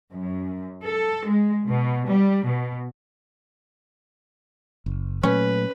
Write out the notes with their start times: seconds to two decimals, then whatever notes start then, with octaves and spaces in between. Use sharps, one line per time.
0.13 F#2
0.86 A4
1.25 G#3
1.67 B2
2.08 G3
2.45 B2
4.86 F#1
5.23 A#2 F#3 A3 C#4 B4